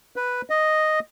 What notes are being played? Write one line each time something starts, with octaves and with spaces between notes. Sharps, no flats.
B4
D#5